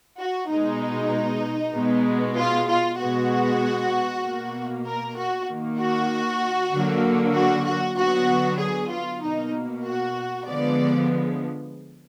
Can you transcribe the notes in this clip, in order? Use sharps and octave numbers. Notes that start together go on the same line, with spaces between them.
F#4
B2 G#3 B3 D#4
B2 G#3 B3
F4
F4
B2 G#3 B3 F#4
B2 A#3
A#4
F#4
D#3 A#3
F#4
D3 F#3 A#3
F#4
F#4
D3 F#3 B3 F#4
G#4
F4
B2 A#3 D#4
F#4
D3 F3 G#3 B3 D5